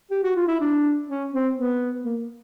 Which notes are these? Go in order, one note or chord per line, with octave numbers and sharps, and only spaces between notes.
G4
F#4
F4
E4
D4
C#4
C4
B3
A#3